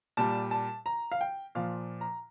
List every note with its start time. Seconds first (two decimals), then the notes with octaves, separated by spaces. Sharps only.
0.17 A#2 G3 A5
0.51 A5
0.86 A#5
1.12 F5
1.21 G5
1.55 A#2 F3 F5
2.01 A#5